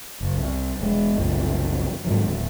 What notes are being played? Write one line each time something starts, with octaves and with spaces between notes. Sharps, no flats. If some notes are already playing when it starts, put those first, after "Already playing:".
F#1
C2
E1 G#3
F#1 C2 A#2
G#2 D#3 F#3
D1